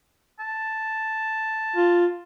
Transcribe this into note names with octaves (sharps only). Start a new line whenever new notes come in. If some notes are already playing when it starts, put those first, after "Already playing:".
A5
F4